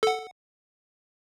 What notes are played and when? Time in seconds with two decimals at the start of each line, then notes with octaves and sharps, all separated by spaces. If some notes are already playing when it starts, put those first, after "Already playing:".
0.03 A4 F#5